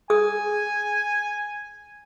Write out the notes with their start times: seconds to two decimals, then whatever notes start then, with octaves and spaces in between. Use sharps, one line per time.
0.10 G#4 G#5 D#6